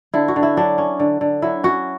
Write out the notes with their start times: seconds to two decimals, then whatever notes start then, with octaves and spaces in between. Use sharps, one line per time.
0.14 D3 E4
0.28 F#4
0.36 D3
0.43 E4
0.57 F#3 D4
0.78 C#4
1.00 D3
1.21 D3
1.42 F#3 E4
1.63 C#4 F#4